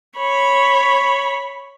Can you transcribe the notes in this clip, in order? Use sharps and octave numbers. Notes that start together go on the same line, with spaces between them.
C#5 B5